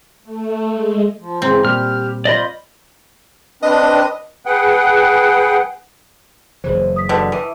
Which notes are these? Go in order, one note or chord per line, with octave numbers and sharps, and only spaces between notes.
A3
G#3
F3
G#2 C#3 E3 G#3 C4 A#5
A#2 G3 G4 F6
F4 C5 D5 D#5 B5
C4 D4 B4 D#5
G#4 B4 F#5 G5
F#1 C#3 E3 C5
D#6 B6
B2 D3
E3